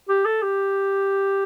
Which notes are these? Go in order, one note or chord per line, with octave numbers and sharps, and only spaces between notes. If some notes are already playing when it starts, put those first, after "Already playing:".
G4
A4
G4